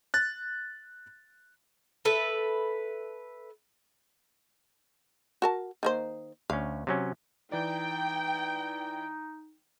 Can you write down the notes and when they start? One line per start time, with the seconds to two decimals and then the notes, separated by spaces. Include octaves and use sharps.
0.14 F#6 A6
2.05 A4 B4 E5
5.42 F#4 A#4 A5
5.83 D#3 A#3 C5
6.50 D2 C#4 F5
6.87 C3 F#3 C#4
7.52 E3 D#4 D5 G5